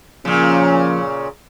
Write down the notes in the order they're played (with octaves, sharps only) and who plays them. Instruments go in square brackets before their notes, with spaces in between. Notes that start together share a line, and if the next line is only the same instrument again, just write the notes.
[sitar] A#2 C#3 [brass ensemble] F3 A#3 C#4